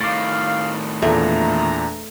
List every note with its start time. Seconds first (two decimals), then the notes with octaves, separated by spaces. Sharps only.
0.01 A2 D#3 F5 D6 A6
1.02 E2 A#2 A3 D4 A#5